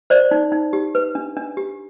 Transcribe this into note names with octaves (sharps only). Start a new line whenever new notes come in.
C5 D5
D#4
D#4
G4
B4
D4
D4
G4